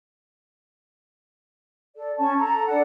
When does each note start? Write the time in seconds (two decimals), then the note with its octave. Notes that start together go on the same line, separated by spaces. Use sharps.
1.96 A4 D5
2.18 C#4 A5 C#6
2.38 A4 A#5
2.67 D4 A4 F#5